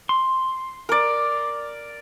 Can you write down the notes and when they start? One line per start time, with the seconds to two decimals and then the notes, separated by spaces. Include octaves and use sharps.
0.09 C6
0.89 A#4 D5